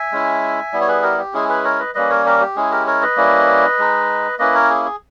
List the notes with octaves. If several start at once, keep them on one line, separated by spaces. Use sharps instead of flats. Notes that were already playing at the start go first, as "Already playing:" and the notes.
Already playing: E5 G#5
G#3 C#4 E4
G3 B3 E4
C#5
G#4 B4
G4 A#4
G4
G#3 C#4 E4 G#4
G#4 B4
A#4 C#5
B4 D#5
G3 A#3 C#4 B4 D#5
A#4 C#5
G4 A#4
G4
G#3 C#4 E4 G#4
G4 A#4
A#4 C#5
B4 D#5
G3 A#3 C#4 E4
G#3 D#4
A#3 C#4 E4 B4 D#5
A#4 C#5
G#4
G#4